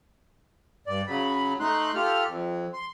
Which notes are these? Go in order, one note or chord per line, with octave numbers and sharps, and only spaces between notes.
G2 D5
C#3 F#3 B5
A3 D#4 C6 F#6
F4 G4 A4 F6
F2
C6